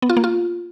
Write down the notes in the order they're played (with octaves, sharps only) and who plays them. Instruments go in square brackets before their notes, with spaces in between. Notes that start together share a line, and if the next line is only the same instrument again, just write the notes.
[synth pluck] B3
F4
A#3
F4